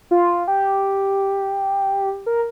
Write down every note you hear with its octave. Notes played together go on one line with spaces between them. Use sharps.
F4
G4
A#4